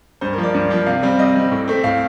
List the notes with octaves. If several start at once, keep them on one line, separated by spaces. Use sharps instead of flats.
G2 C5
A#4
F3 A#3
D5
G2
F3 A#3
C3 F5
G3 C4
C3 D#5
G3 C4
A2
A3 C4
A2 F5